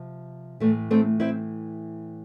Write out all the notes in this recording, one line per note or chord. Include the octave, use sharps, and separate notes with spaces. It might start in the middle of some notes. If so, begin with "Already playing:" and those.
Already playing: C3 F3
A2 E3 A3
A3 C4
C4 E4